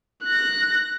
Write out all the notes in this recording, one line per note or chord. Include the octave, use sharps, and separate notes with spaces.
F#6 A#6